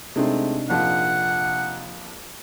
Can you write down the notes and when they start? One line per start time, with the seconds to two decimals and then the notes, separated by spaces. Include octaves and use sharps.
0.16 C3 G#3 A3 C4 D4 D#4
0.70 A#1 F2 A#2 F#5